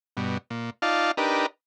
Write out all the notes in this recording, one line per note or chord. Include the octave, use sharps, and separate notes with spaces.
G2 B2
A#2
D#4 F4 D5 F5 A5
D4 D#4 G4 A#4 B4